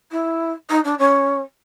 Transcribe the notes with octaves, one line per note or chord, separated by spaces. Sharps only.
E4
D#4
D4
C#4